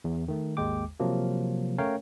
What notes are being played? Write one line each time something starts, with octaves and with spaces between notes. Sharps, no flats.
E2
D#3 A3
G#1 D#2 G#3 G5 D6
C3 F3 F#3 A#3
A3 C#4 A#4 C#5 F5 G5